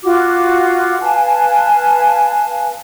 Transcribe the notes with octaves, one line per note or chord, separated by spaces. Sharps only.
F4 F#4 D6
B4 F5 G#5 A5